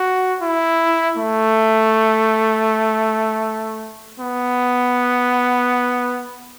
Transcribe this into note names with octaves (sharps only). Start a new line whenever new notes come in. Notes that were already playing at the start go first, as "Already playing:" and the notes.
Already playing: F#4
E4
A3
B3